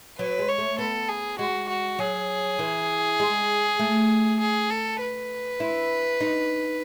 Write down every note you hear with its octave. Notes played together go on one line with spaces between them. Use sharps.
F#3 B4
G#3
C#5
A3
B3 A4
G#4
G#3 F#4
F#4
F#3 G#4
E3
G#3
A3
G#4
A4
B4
E4
D#4